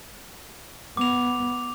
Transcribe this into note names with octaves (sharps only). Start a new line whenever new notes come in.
B3 D6 F7